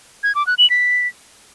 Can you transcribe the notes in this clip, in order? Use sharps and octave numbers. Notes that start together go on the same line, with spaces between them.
G#6
D6
F#6
F#7
B6